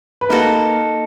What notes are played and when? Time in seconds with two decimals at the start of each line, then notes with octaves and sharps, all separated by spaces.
0.21 B4
0.29 A#3 D#4 F#4 A4 A#4